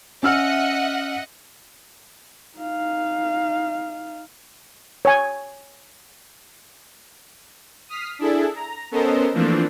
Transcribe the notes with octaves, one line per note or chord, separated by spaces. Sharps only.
C#4 D#5 E5 F#5 E6 F6
D#4 F5
C#5 G#5
D#6 F6 B6 C7
D4 E4 G#4 A4
A#5
B3 C#4 A4 A#4 C5 D#5
E3 F3 A3 A#3 C4 D4